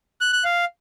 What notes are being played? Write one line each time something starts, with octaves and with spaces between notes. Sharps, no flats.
F#6
F#6
F5